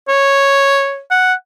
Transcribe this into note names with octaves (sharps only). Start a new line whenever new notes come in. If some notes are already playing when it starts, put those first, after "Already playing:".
C#5
F#5